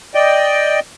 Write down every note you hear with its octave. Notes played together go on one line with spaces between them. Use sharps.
D5 D#5 G5